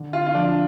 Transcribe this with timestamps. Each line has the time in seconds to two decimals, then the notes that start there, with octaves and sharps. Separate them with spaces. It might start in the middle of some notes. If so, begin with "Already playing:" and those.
Already playing: D3
0.13 F4
0.26 F4
0.35 F3 D4